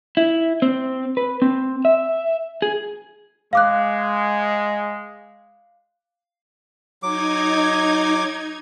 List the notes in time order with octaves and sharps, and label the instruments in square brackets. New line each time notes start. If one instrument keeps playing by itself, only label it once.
[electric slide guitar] E4
C4
B4
C4
E5
G#4
[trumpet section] G#3 [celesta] F5 D6 F#6
[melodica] F#3 D6 [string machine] D#4 G#6